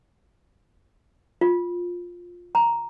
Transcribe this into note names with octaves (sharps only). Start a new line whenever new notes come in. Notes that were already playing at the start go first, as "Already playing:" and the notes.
F4
A#5